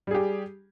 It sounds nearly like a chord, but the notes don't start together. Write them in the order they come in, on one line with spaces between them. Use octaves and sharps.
G3 G#4 G4